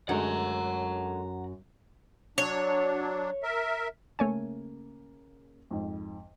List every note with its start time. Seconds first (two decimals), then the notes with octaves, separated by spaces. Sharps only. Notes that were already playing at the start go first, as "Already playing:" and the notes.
0.09 F#2 D3 G#3 A3 F#5 A#5
2.38 F#3 D4 C#5
3.43 A#4 E5
4.19 C#3 A3 A#3 C#5 G#5
5.71 F2 G#2